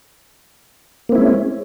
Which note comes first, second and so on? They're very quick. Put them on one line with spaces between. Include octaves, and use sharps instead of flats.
A#3 C4 E4 G#3 C#4